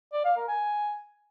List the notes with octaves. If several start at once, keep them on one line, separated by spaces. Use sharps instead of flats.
D5
F5
A#4
G#5